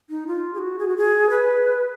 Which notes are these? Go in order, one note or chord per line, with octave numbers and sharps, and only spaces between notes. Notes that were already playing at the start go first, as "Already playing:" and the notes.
D#4
F4
G#4
F#4
G#4
F#4
G#4
B4